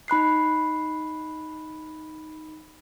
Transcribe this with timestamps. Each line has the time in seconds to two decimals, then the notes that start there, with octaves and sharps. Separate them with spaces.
0.08 D#4 B5 F#6 C7